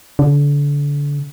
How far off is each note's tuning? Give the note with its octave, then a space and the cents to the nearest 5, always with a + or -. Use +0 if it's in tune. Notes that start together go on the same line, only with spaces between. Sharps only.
D3 -30